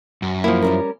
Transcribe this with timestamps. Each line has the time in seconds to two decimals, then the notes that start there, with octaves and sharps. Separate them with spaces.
0.22 F#2
0.44 F3 A#3 E4
0.62 G3 C#4 A#4